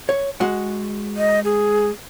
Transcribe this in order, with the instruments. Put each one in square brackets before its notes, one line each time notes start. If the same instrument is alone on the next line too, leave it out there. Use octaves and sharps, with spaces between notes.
[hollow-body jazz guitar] C#5
G#3 F#4 F#5
[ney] D#5
G#4